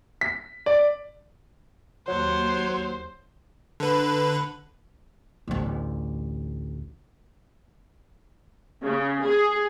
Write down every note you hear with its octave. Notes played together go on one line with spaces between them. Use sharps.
B6
D5
D#2 F#3 C5 C#5
D3 B4
A1 D2
C#3
G#4